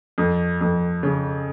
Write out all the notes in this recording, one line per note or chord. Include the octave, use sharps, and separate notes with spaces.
F2
F2
C#3